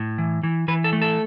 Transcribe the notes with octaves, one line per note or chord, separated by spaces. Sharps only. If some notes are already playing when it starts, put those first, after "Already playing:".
Already playing: A2
E3
E3
E3 B4
A4
A3
A4